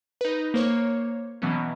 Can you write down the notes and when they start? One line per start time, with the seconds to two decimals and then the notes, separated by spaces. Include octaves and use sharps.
0.21 D#4 B4
0.54 A#3 C5 C#5
1.42 B2 E3 F#3 B3 C#4